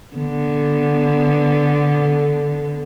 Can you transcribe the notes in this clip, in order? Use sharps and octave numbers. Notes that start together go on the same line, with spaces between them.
D3 B3